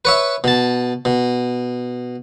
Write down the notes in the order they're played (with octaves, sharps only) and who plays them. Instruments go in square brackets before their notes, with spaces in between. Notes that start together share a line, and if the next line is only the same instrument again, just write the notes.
[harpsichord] B4 C#5 E5
B2 A5
B2